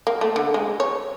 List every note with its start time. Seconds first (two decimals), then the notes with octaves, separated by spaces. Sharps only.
0.07 A#3
0.21 A3
0.36 D3
0.54 G#3
0.80 C#5